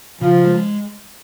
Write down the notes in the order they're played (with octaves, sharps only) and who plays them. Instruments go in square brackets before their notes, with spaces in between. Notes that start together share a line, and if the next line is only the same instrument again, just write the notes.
[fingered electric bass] C#3 [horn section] F3
[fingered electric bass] G#3